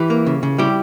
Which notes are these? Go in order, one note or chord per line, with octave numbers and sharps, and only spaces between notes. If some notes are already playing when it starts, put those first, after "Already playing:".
Already playing: E3 E4 G4
A#3
C#3
C#3
G3 E4 G4